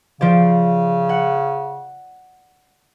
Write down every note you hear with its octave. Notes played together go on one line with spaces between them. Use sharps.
C#3 F3 C5 D5
F#5